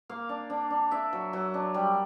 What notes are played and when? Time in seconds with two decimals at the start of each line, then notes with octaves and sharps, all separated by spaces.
0.09 A#3 F5
0.29 D4
0.50 D4
0.70 D4
0.91 D4 E5
1.13 F#3
1.33 F#3
1.54 D4
1.74 G3